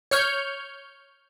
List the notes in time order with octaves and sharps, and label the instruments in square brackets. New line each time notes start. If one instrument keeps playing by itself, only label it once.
[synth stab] C#5 C#6 F6 G6